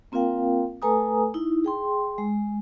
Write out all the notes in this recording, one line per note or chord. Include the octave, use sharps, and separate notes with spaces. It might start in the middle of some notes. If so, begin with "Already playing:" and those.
A#3 C4 F4 A#4 F5 G5
A3 A4 B4 G#5 A#5 D#6
D#4 E4
G#4 G5 C6
G#3